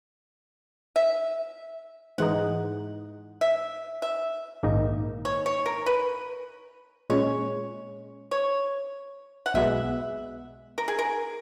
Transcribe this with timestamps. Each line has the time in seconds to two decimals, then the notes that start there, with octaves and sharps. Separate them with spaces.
0.96 E5
2.18 G#2 E3 G#3 D#4 F#5
3.41 E5
4.02 E5
4.63 A#1 G#2 D#3 A#3 D#4
5.25 C#5
5.46 C#5
5.66 A#4
5.86 B4
7.10 A#2 G#3 C#4 C#5
8.31 C#5
9.46 F#5
9.54 B1 B2 G#3 B3 E5
10.78 A#4
10.88 G#4
10.99 A#4